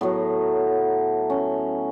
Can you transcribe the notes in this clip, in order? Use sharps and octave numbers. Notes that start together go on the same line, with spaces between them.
A2 F#3 A3 B3
C#4